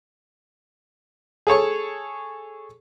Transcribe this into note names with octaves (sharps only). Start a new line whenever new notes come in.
G#4 A4 C#5 C#6